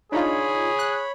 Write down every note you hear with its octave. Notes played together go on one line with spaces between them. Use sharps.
D4 D#4 F4 G#4 C#5 B5
F#6